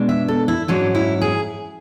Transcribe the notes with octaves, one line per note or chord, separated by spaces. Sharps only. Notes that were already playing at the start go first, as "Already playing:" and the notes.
Already playing: B2 G#3 D4
E5
A4
E4
G#2 F#3 C#4 D4
E4
G#4